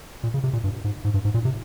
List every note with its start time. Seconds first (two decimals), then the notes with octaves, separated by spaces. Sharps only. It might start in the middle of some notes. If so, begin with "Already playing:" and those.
0.23 A#2
0.34 C#3
0.44 C3
0.53 A#2
0.64 G2
0.84 G#2
1.05 G#2
1.14 G2
1.25 G#2
1.34 A#2
1.45 C3